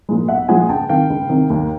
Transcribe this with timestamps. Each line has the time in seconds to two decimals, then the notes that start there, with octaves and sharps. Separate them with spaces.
0.09 A#2 F3 G#3
0.28 B1 E5 F#5
0.48 A#2 F3 G#3 F#5 G#5
0.69 C#2 G5 A5
0.89 C3 D#3 F5 G5
1.10 C#2
1.30 C3 D#3
1.50 D#2